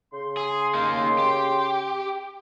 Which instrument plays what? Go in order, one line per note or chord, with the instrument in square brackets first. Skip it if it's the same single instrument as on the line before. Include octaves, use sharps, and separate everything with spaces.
[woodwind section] C#3 C6
[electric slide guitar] G#4
A#3 D#4
G4